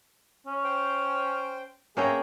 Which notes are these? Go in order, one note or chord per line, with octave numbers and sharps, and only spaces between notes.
C#4
C5 G5
A#3 B3 C#4 G#4 E5 G5 A#5